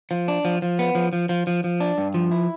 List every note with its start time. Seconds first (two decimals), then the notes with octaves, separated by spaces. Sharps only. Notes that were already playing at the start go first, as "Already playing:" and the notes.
0.11 F3
0.28 D4
0.45 F3
0.62 F3
0.79 B3
0.95 F3
1.13 F3
1.29 F3
1.47 F3
1.64 F3
1.80 D4
1.98 G2
2.14 F3
2.31 E4